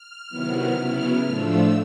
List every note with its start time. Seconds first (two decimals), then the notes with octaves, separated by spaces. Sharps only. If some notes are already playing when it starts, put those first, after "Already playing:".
Already playing: F6
0.29 C3 D#3 F#3 B3 E4
0.76 C#3 F#3 B3 E4
1.24 A2 F3 A3 D4 F4 E6